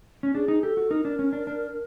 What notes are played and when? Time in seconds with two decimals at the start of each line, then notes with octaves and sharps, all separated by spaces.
0.23 C#4
0.35 D4 G#4
0.48 D#4
0.63 G4 A4
0.77 F#4
0.91 D#4 A#4
1.05 D4
1.19 C#4
1.33 D4
1.47 D4